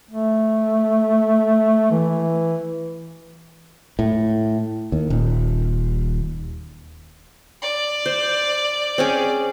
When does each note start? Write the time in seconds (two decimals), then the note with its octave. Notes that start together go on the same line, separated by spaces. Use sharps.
0.11 A3
1.91 E3
3.99 A2
4.92 D#2
5.10 D#1
7.62 D5
8.06 C5
8.98 C4 C#4 G#4